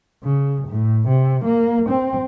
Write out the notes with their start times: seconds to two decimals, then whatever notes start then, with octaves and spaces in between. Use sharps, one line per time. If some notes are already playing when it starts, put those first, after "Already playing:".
0.24 C#3
0.68 A2
1.08 C3
1.45 A#3
1.89 C4